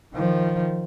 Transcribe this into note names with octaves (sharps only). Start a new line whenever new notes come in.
D#3 F3